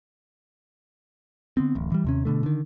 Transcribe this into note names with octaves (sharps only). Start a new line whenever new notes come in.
D3 B3 C4
D1 A1
E3 G3
D#2 C3 C#4
B2 D3 A3
D3 D#3